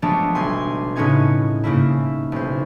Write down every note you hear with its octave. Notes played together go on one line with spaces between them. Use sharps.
F3 F#3 G#3 A3 B3 D4
B1 G3 G#5 C6
A2 C#3 B3 C#4 D#4 G#6
G#2 C#3 A#3 E4
B1 C5